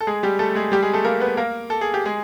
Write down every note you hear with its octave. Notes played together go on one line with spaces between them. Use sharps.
A4
G#3 G#4
G3 G4
A3 A4
G#3 G#4
G3 G4
G#3 G#4
A3 A4
A#3 A#4
B3 B4
A#3 A#4
A4
G#4
G4
G#3 G#4